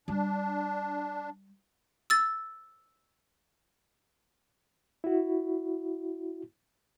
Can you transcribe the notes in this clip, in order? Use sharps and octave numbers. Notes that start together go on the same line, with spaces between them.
G3 D4
E6 A6
E4 F#4